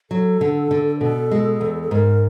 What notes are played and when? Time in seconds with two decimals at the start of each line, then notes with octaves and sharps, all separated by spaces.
0.10 F#3 A4
0.41 D3
0.71 D3
1.01 B2 A4
1.31 G#3
1.61 E2
1.83 A4
1.91 G#2 A#4